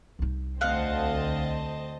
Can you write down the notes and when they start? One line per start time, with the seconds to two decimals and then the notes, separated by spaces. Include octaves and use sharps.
0.19 C2 D#4
0.61 D2 C4 D#5 F5 F#5 A5